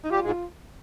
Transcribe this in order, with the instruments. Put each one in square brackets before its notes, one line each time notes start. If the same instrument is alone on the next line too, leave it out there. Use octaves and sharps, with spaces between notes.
[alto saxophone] D#4
[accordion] G3 G4 [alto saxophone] F4
[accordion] G#2 G#3
[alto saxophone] F4